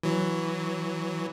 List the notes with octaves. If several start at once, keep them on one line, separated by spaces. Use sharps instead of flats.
E3 F#3